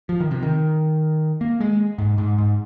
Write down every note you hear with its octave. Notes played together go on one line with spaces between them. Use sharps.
F3
D#3
C3
D#3
A#3
G#3
G#2
G#2
G#2